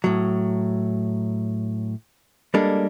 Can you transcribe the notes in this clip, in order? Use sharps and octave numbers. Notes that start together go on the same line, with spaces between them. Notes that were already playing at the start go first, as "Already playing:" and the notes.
A2 F#3
G3 G#3 A#3 D4 A4